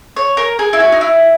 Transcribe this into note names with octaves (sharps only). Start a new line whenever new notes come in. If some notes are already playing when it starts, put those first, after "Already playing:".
C#5
A#4
G#4
E4
F#4
D#4
E4